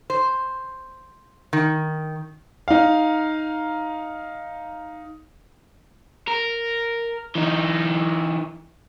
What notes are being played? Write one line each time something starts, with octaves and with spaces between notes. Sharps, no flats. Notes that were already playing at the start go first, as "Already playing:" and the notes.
C5
D#3
D#4 F5
A#4
E3 D#4